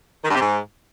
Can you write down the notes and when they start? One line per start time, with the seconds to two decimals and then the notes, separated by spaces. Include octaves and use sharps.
0.24 D#3
0.30 G2
0.35 C3
0.40 G#2